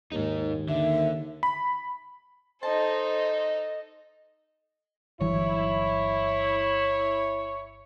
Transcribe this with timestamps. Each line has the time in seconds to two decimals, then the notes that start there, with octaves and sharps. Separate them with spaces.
0.12 D#2 G#2 D#4
0.68 D3 E5
1.43 B5
2.63 D#4 A4 C5 D#5 A5
5.21 G1 E3 F#3 E4 C#5